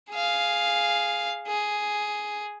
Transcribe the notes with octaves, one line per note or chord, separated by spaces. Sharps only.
G#4 F5
G#4